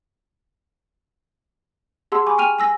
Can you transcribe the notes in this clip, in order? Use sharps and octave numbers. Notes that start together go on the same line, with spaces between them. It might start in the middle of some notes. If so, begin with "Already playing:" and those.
G4 G#4 F#5 A5 C6 E6
G#5 B5 C#6 D6
G5 G#5 F6 D#7 F7
G#5 E6 A#6